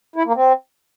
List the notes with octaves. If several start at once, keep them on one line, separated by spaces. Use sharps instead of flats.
E4
A#3
C4